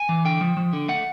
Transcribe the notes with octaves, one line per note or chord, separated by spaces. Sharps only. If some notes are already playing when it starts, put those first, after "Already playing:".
Already playing: G#5
E3
D3 G5
F3
F3
D3
A3 F#5